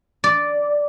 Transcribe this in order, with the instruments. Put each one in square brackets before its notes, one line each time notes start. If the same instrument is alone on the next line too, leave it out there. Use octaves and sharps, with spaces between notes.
[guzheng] D5